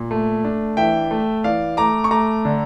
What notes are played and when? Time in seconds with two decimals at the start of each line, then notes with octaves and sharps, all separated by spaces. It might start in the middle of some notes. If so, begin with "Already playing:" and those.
Already playing: A#2
0.11 A3
0.44 D4
0.77 E3 E5 G5
1.11 A3
1.44 E3 D5 F5
1.77 A3 A#5 D6
2.04 C#6
2.11 A3 A#5 D6
2.45 D3